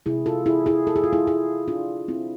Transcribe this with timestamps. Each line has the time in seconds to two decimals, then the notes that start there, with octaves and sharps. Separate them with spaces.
0.06 C3 G#3 E4 G#4
0.26 F4 A4
0.46 E4 G#4
0.66 E4 G#4
0.87 A4
0.96 G#4
1.04 F4
1.13 E4 G#4
1.27 E4 G#4
1.68 D4 F4
2.08 C4 E4